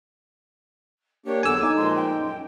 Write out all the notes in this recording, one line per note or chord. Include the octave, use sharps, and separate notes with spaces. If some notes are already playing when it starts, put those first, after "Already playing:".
A#3 D4 G4 C#5
E2 D3 F#3 G#5 D6 E6
D#4 G#5
A#2 F3 G#3 C6
G5
F#2